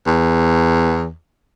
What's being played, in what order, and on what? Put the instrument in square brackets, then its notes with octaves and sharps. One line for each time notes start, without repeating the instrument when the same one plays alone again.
[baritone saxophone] E2